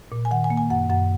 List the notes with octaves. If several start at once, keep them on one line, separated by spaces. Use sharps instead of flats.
A#2
G#5
D#3 F#5
G#5
A#3
G#5
F#2 F#5
F#2 F#5